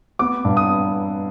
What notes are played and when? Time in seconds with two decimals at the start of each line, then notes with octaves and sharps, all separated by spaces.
0.19 B3 D6
0.45 G2
0.57 D#6